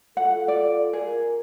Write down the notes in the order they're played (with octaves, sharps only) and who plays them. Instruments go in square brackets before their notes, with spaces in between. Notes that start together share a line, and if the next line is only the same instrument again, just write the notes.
[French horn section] F4 A4 [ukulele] F#5
[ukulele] D5
[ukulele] G#4 [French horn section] A#4